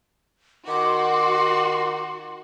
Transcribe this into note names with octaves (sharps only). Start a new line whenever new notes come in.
D#3 F#4 C6 D6